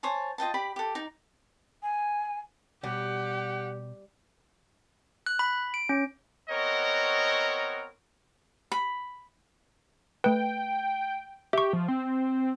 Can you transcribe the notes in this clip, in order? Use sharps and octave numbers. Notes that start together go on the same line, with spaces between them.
C5 C#5 G#5 A5
F4 D#5 G5 A5
G4 D5 B5
G4 A4
D#4
G#5
B2 G3 G4 F#5
F#6
B5
D7
C#4
B3 C4 F#4 A#4 C#5 D#5
B5
A3 B4 G5
G4 E5 C#6
F3
C4